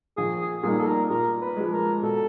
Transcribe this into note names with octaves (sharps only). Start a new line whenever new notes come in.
A#1 G#4
G#4
A#2 G3 A#3 D#4 G#4
A4
A#4
A#2 A#4
B4
F3 G#3
A#4
B2 A4